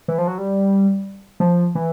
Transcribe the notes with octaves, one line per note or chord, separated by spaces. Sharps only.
E3
F3
F#3
G3
F3
E3